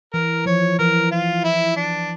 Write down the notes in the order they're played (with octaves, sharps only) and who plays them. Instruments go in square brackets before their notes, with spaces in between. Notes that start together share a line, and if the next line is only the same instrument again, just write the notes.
[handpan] E3 [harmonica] A#4
[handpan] F3 [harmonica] C#5
[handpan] E3 [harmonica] A#4
[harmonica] F4
E4
D4